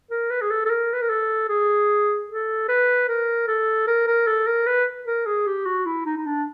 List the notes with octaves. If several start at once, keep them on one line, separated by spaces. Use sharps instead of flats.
A#4
B4
G#4
A4
A4
A#4
B4
A#4
A4
G#4
A4
B4
A#4
A4
A#4
A#4
A4
A#4
B4
A#4
G#4
G4
F#4
E4
D#4
D#4
D4